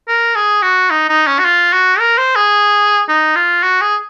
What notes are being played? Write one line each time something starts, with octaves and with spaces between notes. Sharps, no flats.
A#4
G#4
F#4
D#4
D#4
C#4
F#4
F4
F#4
A#4
C5
G#4
D#4
F4
F#4
G#4